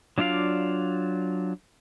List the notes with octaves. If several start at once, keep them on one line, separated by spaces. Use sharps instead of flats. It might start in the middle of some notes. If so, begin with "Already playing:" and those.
F#3 D4 F4 D5 F5